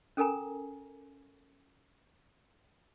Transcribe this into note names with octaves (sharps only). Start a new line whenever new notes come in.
C#4 A4 A#4 G#5 A#5